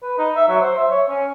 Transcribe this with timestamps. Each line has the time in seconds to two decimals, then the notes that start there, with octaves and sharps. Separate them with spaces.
0.02 B4
0.18 D#4
0.36 E5
0.48 F#3
0.61 C5
0.77 E5
0.91 C#5
1.09 C#4